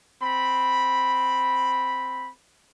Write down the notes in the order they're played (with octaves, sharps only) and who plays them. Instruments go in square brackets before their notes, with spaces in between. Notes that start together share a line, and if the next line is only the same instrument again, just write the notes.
[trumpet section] C4 B5